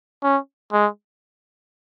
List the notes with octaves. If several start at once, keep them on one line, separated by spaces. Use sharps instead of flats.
C#4
G#3